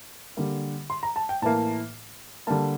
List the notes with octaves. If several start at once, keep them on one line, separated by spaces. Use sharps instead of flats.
D3 G3 A#3
C6
A#5
A5
G5
A2 E3 A#3 A5
D3 G3 A#3 A5